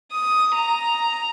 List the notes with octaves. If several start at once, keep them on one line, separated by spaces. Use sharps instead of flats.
D#6
A#5